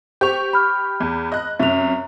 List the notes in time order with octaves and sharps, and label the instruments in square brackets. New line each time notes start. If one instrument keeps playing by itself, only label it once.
[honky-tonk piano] G4 C#6 [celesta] C5 F7
[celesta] B5 F6
[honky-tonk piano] E2
D#5 F#6
[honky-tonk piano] F#2 C3 [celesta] E5 F7